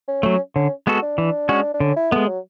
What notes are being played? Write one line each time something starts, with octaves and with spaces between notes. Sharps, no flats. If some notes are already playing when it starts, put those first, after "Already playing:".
C#4
F#3 A3 C#4
D3 C#4
G#3 B3 F#4 A4
D4
E3
G#3 C#4 F#4
D4
D3 C#4
E4
G#3 A3 B3
F#3